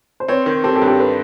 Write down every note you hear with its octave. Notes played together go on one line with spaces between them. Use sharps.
C5
C4 B4 C#5
D#3
C4 G4 A4
G4 A4
G2
G4 A4
A4 B4